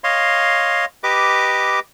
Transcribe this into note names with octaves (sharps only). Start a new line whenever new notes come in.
C#5 D#5 F5 C6
G4 B4 D#5 D6